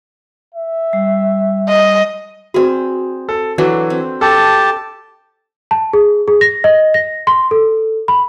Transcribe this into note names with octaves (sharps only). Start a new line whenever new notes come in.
E5
G3
D#5
C4 F#4 G#4 B4 D5
A4
E3 F#3 D4 A4
C4
G4 A4 A5
A5
G#4
G#4
A#6
D#5
A#6
C6
A4
B5